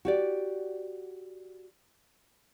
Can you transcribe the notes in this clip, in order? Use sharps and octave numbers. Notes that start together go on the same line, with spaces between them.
F#4 G4 D5